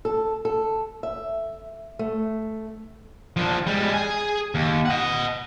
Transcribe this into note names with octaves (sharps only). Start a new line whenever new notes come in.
A4
A4
E5
A3
F3 D4
G3 G#3
G#4 G#5
D#2
D#5 F#5